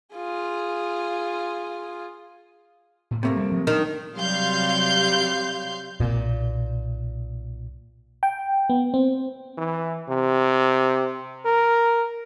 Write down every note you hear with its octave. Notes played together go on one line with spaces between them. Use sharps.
F4 G#4
A2
C3 A3 A#3
G3 C4
F3 F#3
D#3 C#4 D4
C3 F#3 G3 F5 C6 G6
B1 A#2
G5
B3
C4
E3
C3
A#4